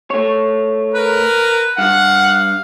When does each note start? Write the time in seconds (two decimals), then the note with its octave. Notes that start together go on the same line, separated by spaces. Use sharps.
0.10 A3 C#5
0.95 A#4 B4
1.78 G2 F5 F#5